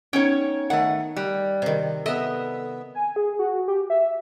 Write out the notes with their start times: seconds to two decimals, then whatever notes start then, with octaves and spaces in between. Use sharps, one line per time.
0.13 B3 C#4 D#4 C#5 G5
0.70 D#3 A3 F#5
1.17 G3 F#6
1.62 C3 D#3
2.06 B3 A4 D#5 E5
2.95 G#5
3.16 G#4
3.39 F#4
3.68 G4
3.90 E5